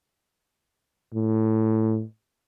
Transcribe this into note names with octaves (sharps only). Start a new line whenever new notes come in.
A2